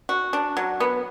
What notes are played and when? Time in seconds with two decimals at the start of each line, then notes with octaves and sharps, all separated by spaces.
0.09 F#4
0.33 D4
0.57 F#3
0.80 B3